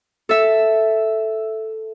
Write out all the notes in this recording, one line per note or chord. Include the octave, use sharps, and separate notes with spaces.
A4 E5